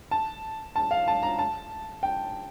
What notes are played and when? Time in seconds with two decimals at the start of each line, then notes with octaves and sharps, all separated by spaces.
0.11 A5
0.76 A5
0.91 F5
1.08 A5
1.23 A#5
1.39 A5
2.03 G5